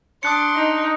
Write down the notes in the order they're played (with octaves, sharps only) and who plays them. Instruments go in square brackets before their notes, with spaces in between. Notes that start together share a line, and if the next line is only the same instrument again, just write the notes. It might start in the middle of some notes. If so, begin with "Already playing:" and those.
[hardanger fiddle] D4 C6 [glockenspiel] D#6 F#6 C#7
[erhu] D#4